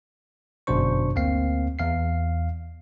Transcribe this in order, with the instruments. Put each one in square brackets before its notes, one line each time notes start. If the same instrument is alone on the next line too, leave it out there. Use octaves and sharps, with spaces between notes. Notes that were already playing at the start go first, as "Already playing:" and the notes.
[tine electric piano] G1 F#2 B2 D4 C5 C#6
D2 A#3 C4 F5 C7
E2 F5 C7